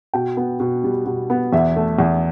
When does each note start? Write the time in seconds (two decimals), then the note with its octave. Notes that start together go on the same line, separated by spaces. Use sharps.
0.14 B2 G5
0.37 B3
0.60 B2
0.84 G3
1.06 B2
1.30 B3
1.53 E2 E5
1.76 A3
1.99 E2